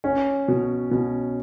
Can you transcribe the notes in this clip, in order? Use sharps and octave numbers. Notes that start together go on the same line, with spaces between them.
C#4
B2
B2